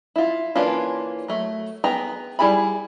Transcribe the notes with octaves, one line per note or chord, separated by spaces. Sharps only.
E4 F4
E3 A#3 C#4 D4 F4
F#3 A3
B3 G#4 G5 A#5
G3 E4 G#4 G#5 B5